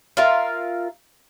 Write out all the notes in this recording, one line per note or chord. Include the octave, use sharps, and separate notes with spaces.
F4 A#4 E5 F5